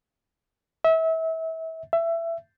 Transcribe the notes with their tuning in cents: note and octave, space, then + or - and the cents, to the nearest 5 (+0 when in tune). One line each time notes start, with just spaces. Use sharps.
E5 -30
E5 +20